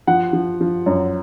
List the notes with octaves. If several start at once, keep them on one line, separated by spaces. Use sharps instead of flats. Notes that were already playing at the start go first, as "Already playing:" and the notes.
F3 F#5
F3
F3
F#2